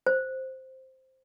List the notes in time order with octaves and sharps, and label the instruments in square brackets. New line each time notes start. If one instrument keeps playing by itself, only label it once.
[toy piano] C5